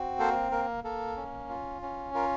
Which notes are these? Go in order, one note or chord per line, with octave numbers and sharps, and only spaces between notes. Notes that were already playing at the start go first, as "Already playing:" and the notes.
Already playing: C4 F#4
A#3 A4 C5
A#3 A#4
A#3 A4
C#4
F4
C#4
F4 A#4